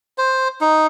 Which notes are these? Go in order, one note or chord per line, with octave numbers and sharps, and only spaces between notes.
C5
D#4